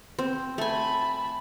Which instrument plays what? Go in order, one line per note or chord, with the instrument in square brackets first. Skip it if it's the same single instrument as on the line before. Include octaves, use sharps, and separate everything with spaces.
[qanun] C4
[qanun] A3 G#5 [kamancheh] A5 B5